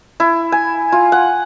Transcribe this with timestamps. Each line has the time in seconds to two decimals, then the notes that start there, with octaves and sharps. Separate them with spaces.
0.20 E4
0.52 G#5
0.92 F4
1.12 F#5